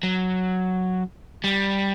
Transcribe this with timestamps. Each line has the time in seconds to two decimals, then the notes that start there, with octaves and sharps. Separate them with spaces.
0.03 F#3
1.44 G3